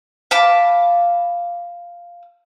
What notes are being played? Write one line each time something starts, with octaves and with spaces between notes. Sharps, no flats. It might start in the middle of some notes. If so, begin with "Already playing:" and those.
F5 A5 B5 D6